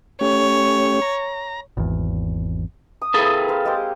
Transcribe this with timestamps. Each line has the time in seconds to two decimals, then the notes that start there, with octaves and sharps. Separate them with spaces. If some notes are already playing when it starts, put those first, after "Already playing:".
0.21 A3 C#4 G4 C#5
1.02 A#5
1.77 G#1 E2
3.01 D#6
3.14 A#3 C4 E4 G#4 A4 B4
3.48 A#4 C5 F5
3.65 G#3 G4 C5